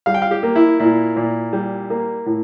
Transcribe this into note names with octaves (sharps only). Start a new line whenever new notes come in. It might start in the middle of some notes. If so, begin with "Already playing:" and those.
G3 F5
G5
F5
G4
A#3
E4
A#2 E4
A#2
G3
A#3
A2